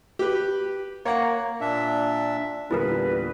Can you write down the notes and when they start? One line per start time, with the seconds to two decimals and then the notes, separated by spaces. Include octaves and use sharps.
0.19 G4 B4
1.05 A#3 C#5 F#5
1.61 A#2 D4 E5
2.71 E2 A#2 D3 G3 E4 G#4 A#4 B4